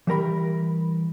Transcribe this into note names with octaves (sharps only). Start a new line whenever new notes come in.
E3 G3 A#4 B5